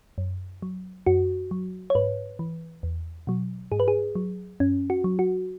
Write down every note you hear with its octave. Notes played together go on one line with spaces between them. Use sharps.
F#2
F#3
F#2 F#4
F#3
C#5
G#2 B4
E3
E2
B2 F#3
G#2 G#4
B4
G#4
F#3
F#2 C#4
F#4
F#3
F#4